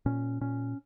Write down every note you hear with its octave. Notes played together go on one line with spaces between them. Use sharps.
A#2 C#4
A#2 C#4